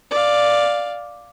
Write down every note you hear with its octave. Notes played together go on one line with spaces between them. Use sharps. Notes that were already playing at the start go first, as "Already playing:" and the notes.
D5 F5